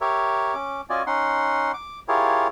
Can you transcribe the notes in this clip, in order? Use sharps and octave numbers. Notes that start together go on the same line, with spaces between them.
G4 A#4 C#5 E5
C#4 D6
C#4 F4 F#4 D5 D#5 G#5
C#4 D#4 F#5 C6
D6
E4 F4 G4 G#4 A#4 C#5